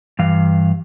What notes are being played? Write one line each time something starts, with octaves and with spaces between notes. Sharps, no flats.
G2 E3 F5